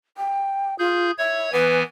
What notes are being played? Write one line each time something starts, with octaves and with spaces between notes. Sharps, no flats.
G5
F4 G#4 G6
C#5 E5 G#6
E3 B3 B4 G#5